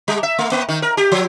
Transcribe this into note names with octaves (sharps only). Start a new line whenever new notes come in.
G3
E5
A3
A#3
D#3
A#4
G4
F3